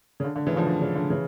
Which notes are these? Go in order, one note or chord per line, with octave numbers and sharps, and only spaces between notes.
C#3
D3
D3
C#3 E3
D3 F3
D3
C#3
D3
C#3 E3